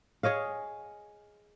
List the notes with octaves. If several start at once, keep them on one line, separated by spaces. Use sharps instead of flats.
G#4 C#5 D#5 F5